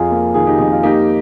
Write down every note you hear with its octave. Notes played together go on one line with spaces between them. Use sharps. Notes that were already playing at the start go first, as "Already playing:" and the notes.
Already playing: F2 F4 G#4
A#3
D#3 F4 G#4
D#4 G4
F2 D#4
F4
A#3 D#4 G4